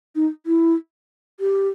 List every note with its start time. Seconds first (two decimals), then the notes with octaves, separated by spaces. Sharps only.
0.15 D#4
0.46 E4
1.40 G4